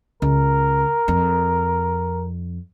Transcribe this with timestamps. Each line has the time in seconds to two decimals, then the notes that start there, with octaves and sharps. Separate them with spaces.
0.22 C#2 A#4
1.08 F2